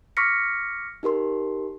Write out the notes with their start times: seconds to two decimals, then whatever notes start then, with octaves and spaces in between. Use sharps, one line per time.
0.17 C#6 D6 F6 A#6 B6 C#7
1.03 D#4 G4 A#4 C6